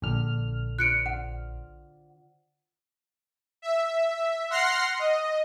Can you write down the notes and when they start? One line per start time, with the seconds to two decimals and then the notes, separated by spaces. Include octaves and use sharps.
0.02 A#1 D3 F6
0.79 F4 C5 D5 F#6 C#7 D7
1.06 F#5
3.62 E5
4.50 F#5 C6 F6 A#6 C7
4.99 D#5